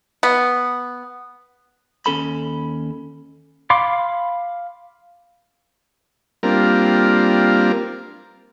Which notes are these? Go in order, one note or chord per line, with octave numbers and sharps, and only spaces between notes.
B3
D#2 C#4 A4 B5
F5 B5 C6 D6
G3 A#3 C4 D4 F4 A#4